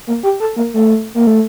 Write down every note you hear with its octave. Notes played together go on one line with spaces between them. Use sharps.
A#3
G4
A4
A#3
A3
A#3
A3